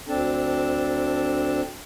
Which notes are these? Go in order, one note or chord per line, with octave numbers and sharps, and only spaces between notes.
D2 C4 D4 A4 A5